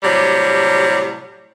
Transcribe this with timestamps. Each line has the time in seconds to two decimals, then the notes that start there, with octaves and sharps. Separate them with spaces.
0.03 A2 C3 F#3 G3